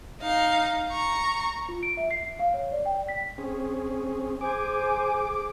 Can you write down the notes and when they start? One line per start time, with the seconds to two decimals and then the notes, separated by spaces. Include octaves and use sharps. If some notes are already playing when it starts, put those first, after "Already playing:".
0.22 D#4 F5
0.88 A#5 C#6
1.69 F4
1.83 D7
1.97 E5
2.11 C7
2.39 F5
2.54 C#5
2.72 D5
2.86 G5
3.09 B6
3.38 C4 C#4 G#4
4.41 G#4 C5 G#5 D6